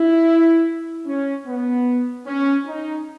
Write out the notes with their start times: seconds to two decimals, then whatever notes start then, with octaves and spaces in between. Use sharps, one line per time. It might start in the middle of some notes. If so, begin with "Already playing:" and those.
Already playing: E4
1.07 C#4
1.47 B3
2.27 C#4
2.67 D#4